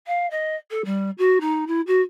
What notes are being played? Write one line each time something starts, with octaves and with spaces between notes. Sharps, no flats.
F5
D#5
A4
G3
F#4
D#4
E4
F#4